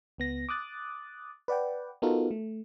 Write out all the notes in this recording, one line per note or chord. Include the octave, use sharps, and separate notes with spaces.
C#2 B3 A#6
D6 D#6 F#6 A6
B4 D5 F#5 G5
B3 D#4 F4 F#4 A4 A#4
A3